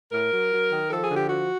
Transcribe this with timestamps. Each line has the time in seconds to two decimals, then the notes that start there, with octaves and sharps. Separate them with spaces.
0.11 A2 A#4
0.31 F#3
0.51 F#3
0.71 D#3
0.91 F3 A4
1.04 G#4
1.09 D3
1.17 G4
1.29 F3 F#4